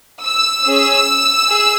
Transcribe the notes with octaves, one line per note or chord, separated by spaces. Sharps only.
E6
C#4 G#4
G#4